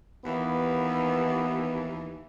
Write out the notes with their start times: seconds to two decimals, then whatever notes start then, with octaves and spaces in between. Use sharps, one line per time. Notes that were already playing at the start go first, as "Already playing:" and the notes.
0.25 D#2 E3 B3